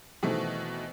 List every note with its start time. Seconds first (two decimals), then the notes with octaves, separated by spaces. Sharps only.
0.23 B2 D#3 E3 A3 C4